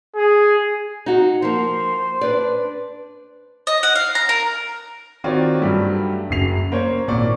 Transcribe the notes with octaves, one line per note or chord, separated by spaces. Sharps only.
G#4
D#4 F#4
F3 A#3 C5
D4 B4 D5
D#5
F#5
F5
A#5
A#4
D#3 C4 F4 F#4 C#5 D5
G2 F#3 G3 A3
F#1 F#2 F#3 C7 F7
A#3 C5 C#5
G#1 A#2 D5 C#6